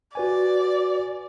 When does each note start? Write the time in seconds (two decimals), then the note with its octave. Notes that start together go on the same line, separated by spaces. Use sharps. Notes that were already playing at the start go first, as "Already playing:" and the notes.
0.15 F#4 B4 D5 G#5